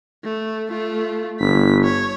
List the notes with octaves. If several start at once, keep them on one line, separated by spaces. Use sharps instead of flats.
A3
A3 F4
G1 B6
C#5